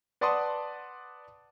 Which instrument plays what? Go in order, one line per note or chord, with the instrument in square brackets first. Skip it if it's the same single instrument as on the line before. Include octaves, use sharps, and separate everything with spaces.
[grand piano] B4 D5 F#5 A5 C6 D#6